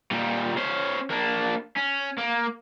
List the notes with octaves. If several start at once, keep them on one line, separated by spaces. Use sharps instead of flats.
A#2 G3
C#4 C5
A#3 D4
C#4
A#3